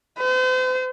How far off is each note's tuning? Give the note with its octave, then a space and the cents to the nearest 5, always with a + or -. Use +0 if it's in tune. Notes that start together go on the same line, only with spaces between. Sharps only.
C5 -40